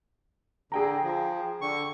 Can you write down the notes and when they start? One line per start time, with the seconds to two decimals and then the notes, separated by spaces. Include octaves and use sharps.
0.72 D3 G#4 G5 A#5
1.03 F3
1.61 D3 C#6